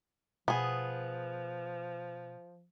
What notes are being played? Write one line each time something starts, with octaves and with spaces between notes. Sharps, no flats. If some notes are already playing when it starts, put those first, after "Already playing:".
B2 F3 B3 G#4